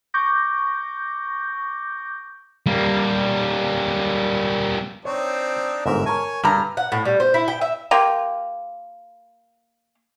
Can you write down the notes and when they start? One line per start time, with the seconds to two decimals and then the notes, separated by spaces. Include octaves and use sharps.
0.14 C#6 D6 G6 A#6
2.66 G3 A#3
5.05 C4 D4 D#4 C#5
5.86 G1 G#2 A#4 E5
6.06 A#4 C#5 G#5 A5
6.43 G2 A#5 F6
6.77 F#5
6.92 A2
7.05 G3
7.20 C5
7.34 E4
7.48 G5
7.61 E5
7.91 A#3 F4 G4